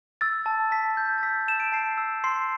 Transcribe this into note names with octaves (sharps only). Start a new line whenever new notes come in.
E6 A6
A5
A5 B6
G6
A6
E6 B6
A5 E7
D7
A5 C7
E6
C6 C7